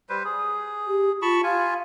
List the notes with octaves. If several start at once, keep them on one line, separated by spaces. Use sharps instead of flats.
G3 B4 C5
G#4
G4
F4 A5 B5 C#6
F4 F5 G#5